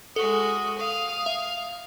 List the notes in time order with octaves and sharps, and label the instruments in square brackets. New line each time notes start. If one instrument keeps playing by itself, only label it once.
[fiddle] G#3 F#4 [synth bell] A4 [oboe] D#6
[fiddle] F5
[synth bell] E5